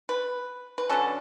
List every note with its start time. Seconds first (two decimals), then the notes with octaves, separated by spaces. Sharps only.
0.09 B4
0.78 B4
0.89 D3 F#3 C#4 A4